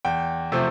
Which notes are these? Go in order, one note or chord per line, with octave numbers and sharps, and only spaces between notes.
E2 G5
C3 F3 A3 C4